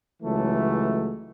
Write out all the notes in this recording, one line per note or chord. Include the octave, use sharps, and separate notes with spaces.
C#2 E3 F#3 A3